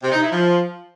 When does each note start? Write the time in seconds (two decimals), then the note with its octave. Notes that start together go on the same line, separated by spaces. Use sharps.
0.02 C3
0.12 D#4
0.21 E4
0.31 F3